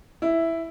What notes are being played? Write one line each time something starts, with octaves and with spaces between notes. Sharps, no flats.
E4